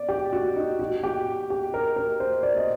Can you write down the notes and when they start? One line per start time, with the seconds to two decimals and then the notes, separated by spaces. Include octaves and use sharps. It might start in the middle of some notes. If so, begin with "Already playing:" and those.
Already playing: D5
0.09 G4
0.33 F#4
0.56 D#4
0.79 F#4
1.03 G4
1.50 G4
1.74 A#4
1.96 A#4
2.20 C5
2.43 D5
2.56 D#5